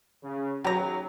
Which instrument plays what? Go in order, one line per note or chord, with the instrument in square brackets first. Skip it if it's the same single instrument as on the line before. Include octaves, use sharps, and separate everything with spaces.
[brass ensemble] C#3
[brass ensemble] D#2 C#3 [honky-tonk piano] F#3 [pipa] G4 A#5